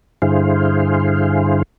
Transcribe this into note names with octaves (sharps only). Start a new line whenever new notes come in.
G2 D3 E4 G#4 C5 F5